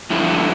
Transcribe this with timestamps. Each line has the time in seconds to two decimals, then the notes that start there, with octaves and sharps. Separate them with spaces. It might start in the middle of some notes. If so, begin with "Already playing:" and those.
0.10 G2 D3 F3 E4